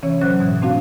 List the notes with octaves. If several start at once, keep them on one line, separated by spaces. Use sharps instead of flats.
C3 E3 C#4 C#5
A#2 F#3 C#4 C5 F#6
G#2 B2 E3
A3 C4 D4 F#4 F5